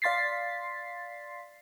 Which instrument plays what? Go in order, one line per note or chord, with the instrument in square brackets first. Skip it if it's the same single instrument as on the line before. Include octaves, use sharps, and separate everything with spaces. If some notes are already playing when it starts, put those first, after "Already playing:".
[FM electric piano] D5 F5 C6 A6 B6 C7